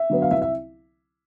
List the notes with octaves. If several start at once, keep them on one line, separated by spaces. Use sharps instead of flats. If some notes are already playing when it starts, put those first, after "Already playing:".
Already playing: E5
D3 F#3 B3
F5
C2 E5
E5